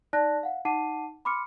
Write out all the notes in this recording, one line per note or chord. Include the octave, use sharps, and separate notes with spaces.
D#4 D5 A5 F#6 A#6
F5 F#5
D#4 F#5 A5 D6 C7 D#7
B5 C6 D6 F6 C#7